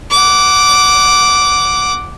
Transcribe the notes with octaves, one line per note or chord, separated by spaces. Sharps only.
F#5 D6